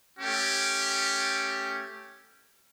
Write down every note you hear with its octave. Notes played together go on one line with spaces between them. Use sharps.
A3 C#4 G4